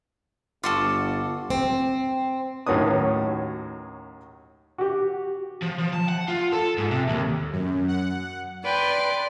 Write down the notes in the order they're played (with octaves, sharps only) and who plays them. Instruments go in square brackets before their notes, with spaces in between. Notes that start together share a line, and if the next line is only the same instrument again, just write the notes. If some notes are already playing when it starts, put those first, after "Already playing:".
[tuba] G1 [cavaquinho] F4 F#4 A4 [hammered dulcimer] D5
[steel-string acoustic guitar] C4
[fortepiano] D#2 A2 F#3 C#4 B4 D#6
F#4 G4
[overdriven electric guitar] F3
F3
A5
F#5
F4
A4
G#2
C3
D#2
[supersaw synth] F#2
F#5
[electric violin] B4 G5 [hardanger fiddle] D5 C6